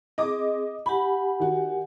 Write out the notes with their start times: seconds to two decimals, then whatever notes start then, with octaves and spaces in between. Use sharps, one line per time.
0.18 C4 G#4 D#5 D6
0.86 G4 F#5 G#5 B5
1.40 D#3 F#4